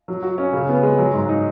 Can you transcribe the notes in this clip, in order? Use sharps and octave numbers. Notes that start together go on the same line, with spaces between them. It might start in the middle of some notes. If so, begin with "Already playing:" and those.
F#3
F#4
C#4
C#3
B3
G#3
F#3
G#2
D#4